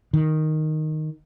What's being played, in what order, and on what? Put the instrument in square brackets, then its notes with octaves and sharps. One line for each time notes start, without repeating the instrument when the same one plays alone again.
[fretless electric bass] D#3